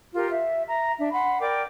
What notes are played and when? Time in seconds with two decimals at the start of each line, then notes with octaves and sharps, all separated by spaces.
0.13 F4 G4 A#4
0.30 E5
0.67 E5 A#5
0.98 D4 E5
1.12 F#5 B5 C6
1.40 A#4 D5 G5 D6